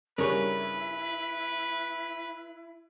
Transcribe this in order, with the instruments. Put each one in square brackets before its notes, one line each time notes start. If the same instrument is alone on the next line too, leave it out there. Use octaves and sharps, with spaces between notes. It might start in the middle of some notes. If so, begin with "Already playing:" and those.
[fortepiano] G2 C#3 G3 [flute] E4 [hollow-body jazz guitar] A#4 C#5 [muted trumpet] B4